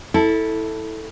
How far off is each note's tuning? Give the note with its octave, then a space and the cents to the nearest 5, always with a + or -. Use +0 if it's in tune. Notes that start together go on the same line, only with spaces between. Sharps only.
E4 -15 A4 +0